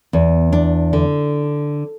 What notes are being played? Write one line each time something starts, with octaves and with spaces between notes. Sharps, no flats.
E2
D4
D3